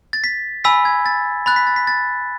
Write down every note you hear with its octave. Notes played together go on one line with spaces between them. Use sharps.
A6
B6
G#5 B5 E6 B6
G#6
A6
B5 F#6 A6
B6
A6
B6
A6